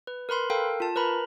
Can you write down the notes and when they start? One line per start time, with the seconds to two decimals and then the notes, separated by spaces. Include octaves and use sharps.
0.07 B4
0.29 A#4 B4 B5 C6
0.50 A4 A#4 F5 G5
0.80 F4 A5
0.96 A#4 B4 A#5 B5